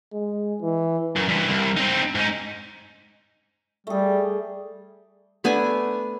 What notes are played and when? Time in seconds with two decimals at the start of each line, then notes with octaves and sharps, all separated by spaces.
0.13 G#3
0.62 E3
1.16 F#2
1.29 G2 E3
1.50 C2
1.77 C4 D#4
2.15 G#2 D#4
3.87 G3 A3 G#4
5.44 A3 B3 D4 G#5